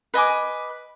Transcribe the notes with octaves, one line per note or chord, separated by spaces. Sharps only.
B4 D#5 G#5 D6